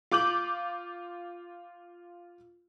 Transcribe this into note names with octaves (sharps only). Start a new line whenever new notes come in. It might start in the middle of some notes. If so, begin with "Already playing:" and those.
F4 D6 G6 F#7